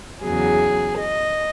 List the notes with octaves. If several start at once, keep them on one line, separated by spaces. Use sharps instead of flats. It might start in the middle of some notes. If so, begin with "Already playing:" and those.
E2 C#3 F#3 G#4
D#5